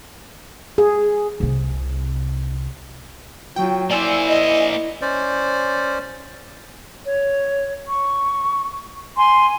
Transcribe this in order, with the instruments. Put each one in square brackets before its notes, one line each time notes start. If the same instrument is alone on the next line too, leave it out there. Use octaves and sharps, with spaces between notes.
[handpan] G#4
[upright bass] C2 C3
[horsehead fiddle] F#3 F4 [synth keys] G5
[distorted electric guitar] A#3 C5 [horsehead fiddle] E4 [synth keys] D5 G#5 E6
[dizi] D#5
[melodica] C#4 C5 D5
[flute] C#5
C#6
[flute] G#5 [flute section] C6